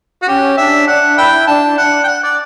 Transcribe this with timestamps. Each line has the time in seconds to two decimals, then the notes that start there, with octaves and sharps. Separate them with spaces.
0.22 F#4
0.27 C#4 G4
0.58 D4 E5
0.87 D4 F#5
1.18 E4 B4 E5 G5
1.47 D4 A5
1.78 D4 F#5
2.04 G5
2.07 F#5
2.23 D5